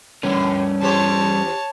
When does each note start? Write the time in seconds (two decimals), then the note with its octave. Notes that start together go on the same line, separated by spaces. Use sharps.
0.23 A2 D3 G3 C#4 A#4 B4
0.81 E2 G4 C5 C#5 A5